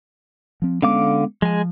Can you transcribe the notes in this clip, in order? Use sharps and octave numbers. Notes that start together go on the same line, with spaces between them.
F3 C4
D3 G#3 B3 C#4 F5 D6
F3 G#3 G#5